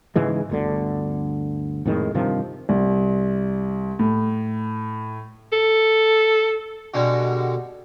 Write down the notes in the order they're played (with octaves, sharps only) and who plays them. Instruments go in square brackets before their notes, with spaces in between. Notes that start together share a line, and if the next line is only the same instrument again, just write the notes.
[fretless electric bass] G#2 C#3 E3 G#3
G1 D2 D3
F2 A2 D#3 G#3
G2 C3 D#3 F3
[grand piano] C2
A2
[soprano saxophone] A4
[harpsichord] B2 D3 G3 G#3